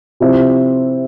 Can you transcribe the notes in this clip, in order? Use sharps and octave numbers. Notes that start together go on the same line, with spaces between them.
C3 F3 C4 E4